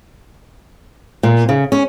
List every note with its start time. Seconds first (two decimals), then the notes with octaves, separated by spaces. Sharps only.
1.23 A#2
1.49 C#3
1.72 C#4